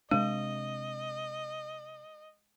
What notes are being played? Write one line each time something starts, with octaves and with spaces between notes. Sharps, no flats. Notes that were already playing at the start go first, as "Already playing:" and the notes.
C3 G#3 D4 D#5